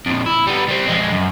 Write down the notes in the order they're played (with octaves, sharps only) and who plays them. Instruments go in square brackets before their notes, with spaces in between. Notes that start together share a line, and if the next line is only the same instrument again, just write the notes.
[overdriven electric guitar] F2 A#2
E4
G3 B3
G3 C4
F2 G#3
F#2